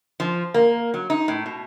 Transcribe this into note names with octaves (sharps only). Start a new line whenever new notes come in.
F3
A#3
F#3
D#4
A2
B2